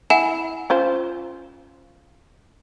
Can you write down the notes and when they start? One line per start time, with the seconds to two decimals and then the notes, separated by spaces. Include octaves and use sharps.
0.10 E4 F#5 G#5 E7
0.70 C#4 F4 C5